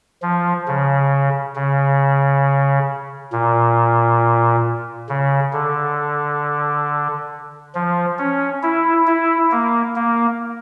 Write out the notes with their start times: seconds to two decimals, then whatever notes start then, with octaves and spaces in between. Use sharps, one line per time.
0.22 F3
0.68 C#3
1.56 C#3
3.32 A#2
5.09 C#3
5.53 D3
7.75 F3
8.19 C#4
8.63 E4
9.07 E4
9.51 A#3
9.96 A#3